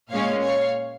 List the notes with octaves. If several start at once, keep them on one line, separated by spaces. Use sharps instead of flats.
A#2 G#3 C#4 C#5 F5
C#5 F5